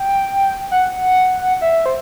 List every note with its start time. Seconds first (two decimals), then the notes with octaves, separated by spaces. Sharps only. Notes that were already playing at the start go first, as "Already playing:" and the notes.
Already playing: G5
0.71 F#5
1.61 E5
1.86 C5